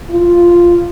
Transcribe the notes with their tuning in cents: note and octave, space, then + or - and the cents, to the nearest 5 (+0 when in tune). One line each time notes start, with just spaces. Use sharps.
F4 -5